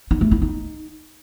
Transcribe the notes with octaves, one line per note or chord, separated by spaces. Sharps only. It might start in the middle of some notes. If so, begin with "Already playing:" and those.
D#4
A3
E4
D#4